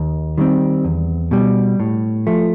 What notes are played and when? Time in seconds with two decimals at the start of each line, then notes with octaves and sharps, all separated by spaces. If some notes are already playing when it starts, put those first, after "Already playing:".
Already playing: D#2
0.38 D#3 G3 C4
0.84 E2
1.31 B2 G3
1.80 A2
2.27 F3 A3